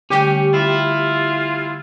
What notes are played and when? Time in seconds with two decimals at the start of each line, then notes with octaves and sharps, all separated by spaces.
0.10 D3 G3 A3 C#4 G4
0.54 E4 F4